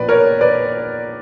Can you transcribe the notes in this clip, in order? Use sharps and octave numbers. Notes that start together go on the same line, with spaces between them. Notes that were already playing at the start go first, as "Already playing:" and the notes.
Already playing: A#1 A#2 B4 D5
A#4 C#5
B4 D5